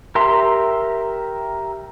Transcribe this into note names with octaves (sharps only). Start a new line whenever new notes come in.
G4 A#4 E5 A#5 C6